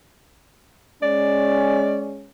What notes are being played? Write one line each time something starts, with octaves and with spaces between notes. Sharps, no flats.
G#3 C#4 D5